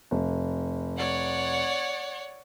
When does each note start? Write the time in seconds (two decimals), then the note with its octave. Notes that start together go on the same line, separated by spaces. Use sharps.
0.11 F1
0.97 C#5 D5 F#5